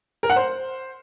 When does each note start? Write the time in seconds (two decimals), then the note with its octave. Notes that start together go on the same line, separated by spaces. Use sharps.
0.23 A#4
0.30 F#5
0.36 C5